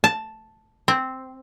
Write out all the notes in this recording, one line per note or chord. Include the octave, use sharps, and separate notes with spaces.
A5
C4